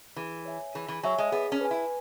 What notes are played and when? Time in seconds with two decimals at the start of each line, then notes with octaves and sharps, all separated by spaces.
0.16 E3 G#4
0.45 C#5 E5 G#5
0.75 E3 G#4
0.88 E3
1.03 F#3 C#5 E5 G#5
1.18 G#3
1.32 B3 G#4
1.52 C#4
1.61 B4 G#5
1.71 E4